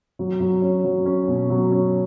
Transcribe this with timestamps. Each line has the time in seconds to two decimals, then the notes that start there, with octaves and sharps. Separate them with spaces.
0.19 F#3
0.40 F#3
0.62 C#4
0.84 F#3
1.06 C#4
1.28 B2
1.50 F#3
1.72 C#4